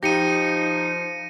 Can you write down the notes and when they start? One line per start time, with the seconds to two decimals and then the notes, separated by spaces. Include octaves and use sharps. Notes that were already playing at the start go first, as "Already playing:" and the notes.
0.03 F3 D#4 G4 A#6 C#7 D#7